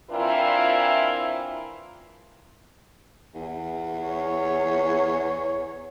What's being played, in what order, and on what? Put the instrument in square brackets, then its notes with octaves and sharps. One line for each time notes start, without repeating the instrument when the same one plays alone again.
[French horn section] E3 C4 D4 E4 F4 A#4
[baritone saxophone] E2
[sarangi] C#5